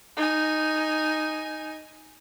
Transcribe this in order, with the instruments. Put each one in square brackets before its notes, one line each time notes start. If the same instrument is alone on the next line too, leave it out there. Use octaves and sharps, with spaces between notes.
[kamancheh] D#4 G#5